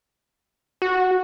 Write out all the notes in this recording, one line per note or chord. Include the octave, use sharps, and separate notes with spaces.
F#4